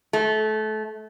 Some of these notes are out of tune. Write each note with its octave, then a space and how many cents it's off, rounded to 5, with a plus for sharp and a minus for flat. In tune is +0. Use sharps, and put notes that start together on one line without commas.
A3 -25